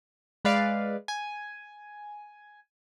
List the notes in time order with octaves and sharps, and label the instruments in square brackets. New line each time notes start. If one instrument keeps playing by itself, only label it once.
[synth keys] G#3 B4 D5 F5
G#5